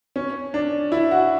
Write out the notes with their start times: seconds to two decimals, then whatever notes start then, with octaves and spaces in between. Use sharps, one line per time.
0.16 C#4
0.54 D4
0.92 E4
1.11 F#4